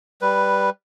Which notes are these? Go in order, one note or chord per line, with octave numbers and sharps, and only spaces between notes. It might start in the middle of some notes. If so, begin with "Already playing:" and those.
G3 B4